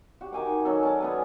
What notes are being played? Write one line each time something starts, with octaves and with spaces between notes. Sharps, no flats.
F#4 G4
D#3 G#5 D6
F#3 C#4 A4
C#4 D5 A5
B3 B4 G#5